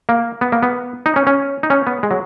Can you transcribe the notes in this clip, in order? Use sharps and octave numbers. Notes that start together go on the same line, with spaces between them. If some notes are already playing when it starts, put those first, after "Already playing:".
A#3
B3
A#3
B3
D#4
C#4
C#4
D#4
C#4
B3
G#3
F#3